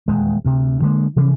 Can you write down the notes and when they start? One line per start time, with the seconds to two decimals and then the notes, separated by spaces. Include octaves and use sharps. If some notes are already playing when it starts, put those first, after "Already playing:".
0.08 D#1 E2 G#3
0.45 D2 C3
0.82 D3 G3 G#3 A#3
1.16 C3 E3 F3 C#4